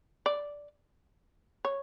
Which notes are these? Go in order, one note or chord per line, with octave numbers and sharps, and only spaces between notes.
D5
C#5